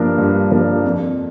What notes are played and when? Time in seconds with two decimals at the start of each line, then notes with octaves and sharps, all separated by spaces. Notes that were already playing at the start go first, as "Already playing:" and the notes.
Already playing: G2 F3 A#3 D4 A#4
0.18 G2
0.51 F3 A#3 D4 A#4
0.84 F2